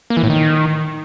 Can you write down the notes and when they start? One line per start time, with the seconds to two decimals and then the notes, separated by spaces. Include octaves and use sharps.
0.10 A#3
0.17 E3
0.23 A2
0.30 D#3